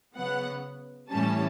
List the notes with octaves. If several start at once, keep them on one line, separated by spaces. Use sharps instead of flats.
C#3 F#3 B3 F#5
A2 E3 G3 C#4 A5